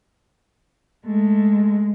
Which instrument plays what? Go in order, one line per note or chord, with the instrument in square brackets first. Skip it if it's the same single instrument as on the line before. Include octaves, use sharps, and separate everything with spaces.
[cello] G#3 [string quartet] A3